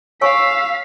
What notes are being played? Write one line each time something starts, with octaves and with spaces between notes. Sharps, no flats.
C#5 F5 G#5 C#6 E6 B6